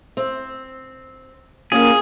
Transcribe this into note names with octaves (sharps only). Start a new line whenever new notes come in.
C4
A#3 C#4 F4 G4 G#4